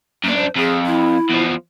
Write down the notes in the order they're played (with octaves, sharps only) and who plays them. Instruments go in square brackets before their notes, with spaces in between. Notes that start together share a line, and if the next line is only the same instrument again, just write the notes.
[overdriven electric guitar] F#2 D4 [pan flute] A#3
[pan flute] C5
[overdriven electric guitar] F2 [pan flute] G#4
[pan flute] E4
[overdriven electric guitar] E2 F3